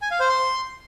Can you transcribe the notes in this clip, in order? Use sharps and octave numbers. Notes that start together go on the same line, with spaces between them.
G#5
F5
C5
C6